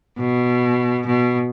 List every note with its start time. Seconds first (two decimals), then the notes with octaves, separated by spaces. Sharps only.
0.19 B2
1.07 B2